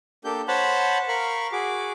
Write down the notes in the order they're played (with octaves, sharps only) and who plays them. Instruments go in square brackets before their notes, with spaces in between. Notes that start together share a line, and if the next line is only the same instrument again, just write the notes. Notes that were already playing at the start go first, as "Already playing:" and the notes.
[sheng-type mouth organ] A#3 D4 G4 A4 G6
C5 C#5 F#5 A5 B5
A#4 F5 B5 C#6
F#4 G#4 D6